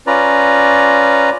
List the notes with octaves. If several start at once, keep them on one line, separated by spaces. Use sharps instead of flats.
C#4 F4 B4 D5 A#5